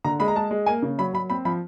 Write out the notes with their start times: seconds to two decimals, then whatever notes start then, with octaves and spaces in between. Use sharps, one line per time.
0.04 D3 A#5
0.19 G#3 B5
0.28 A#5
0.35 G#3 A5
0.51 G#3
0.66 A#3 G#5
0.82 C#3
0.98 F#3 B5
1.13 F#3 B5
1.30 C4 B5
1.45 F3 B5